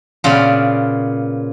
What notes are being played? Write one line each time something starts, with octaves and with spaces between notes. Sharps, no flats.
A#2 C#3 B3 F4 D5